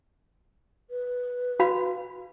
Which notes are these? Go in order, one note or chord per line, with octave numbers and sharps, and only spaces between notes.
B4
F#4 F5 B5